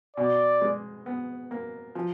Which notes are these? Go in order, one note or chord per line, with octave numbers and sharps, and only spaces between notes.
B2 D5
G#3
B3
A#3
F3